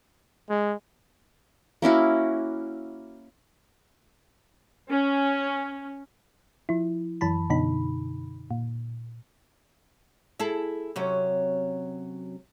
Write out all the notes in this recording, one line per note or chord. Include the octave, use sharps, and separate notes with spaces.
G#3
A#3 C#4 E4 F#4
C#4
F3 E4
F#2 E3 A5 B5
F#2 B2 D3 D#4 B5
A#2
E4 G#4 A4
C3 F#3 C#4